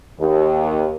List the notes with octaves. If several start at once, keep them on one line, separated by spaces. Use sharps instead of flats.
D#2